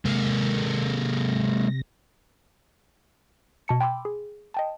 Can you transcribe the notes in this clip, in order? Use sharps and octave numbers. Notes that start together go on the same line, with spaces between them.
C3 G#3 A#3 A#6
B2 A5 C#7
G5 B5 C6 D6 E6
G#4
D#5 G5 A5